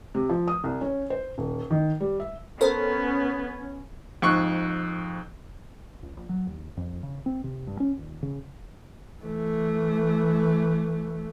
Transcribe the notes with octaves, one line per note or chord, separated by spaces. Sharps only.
C3
F3
D#6
C2
C#4
C5
D#1
D#3
G3
E5
B3 C#4 A4 A#4 C5
F2 G#2 C#6 F#6
C#2
A#1
F#3
D#2
F2
C#3
C4
C3
G2
C#4
D#1
C#3
E3 A3